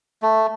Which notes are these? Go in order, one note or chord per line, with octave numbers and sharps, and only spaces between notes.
A3